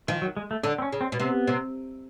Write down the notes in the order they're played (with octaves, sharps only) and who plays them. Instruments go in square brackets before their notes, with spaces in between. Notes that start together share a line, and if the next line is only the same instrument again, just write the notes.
[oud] D#3 [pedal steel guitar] F3
[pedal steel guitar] F#3
G#3
A3
[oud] D3 [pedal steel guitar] D4
[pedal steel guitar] C4
C#4
[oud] C#3
[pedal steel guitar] C4
[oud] B2
[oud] C3 [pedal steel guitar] B3
[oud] C3